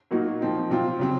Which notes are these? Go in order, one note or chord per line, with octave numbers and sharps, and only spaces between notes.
A#2 F#3 A#3 D#4 F#4
F3 C4 D#4
C3 F#3 C4 F4
C#3 F#3 C4